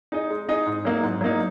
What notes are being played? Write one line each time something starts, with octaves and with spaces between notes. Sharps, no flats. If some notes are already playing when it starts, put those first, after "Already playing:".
D#4 G#4 D#5
G#3
D#4 G#4 D#5
G#2
F#3 A#3 D#4
G#2
F#3 A#3 D#4